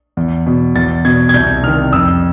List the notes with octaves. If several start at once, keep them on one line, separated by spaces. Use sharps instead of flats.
E2
B2
E2 A6
B2 G#6
G#6
C2 G6
C3 D#3 F6
F2 E6